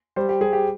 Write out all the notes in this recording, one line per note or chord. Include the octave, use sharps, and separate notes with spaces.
G3 C5
G4
G3 G#4
G4